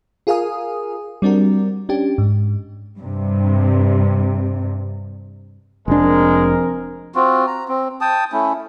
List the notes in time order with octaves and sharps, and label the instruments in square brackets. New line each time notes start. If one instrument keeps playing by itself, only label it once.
[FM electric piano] F4 G#4 A#4 F5 G#5 D#6
G3 C4 D4 F#4 A#4
C#4 D4 G4
G#2
[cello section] G2 C3
[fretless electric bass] F1 D4 [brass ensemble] F3 C4 A#4 [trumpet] G#3
[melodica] C4 F4 F#4
A#5
C4
G5 A5 D#6
A3 C#4 E4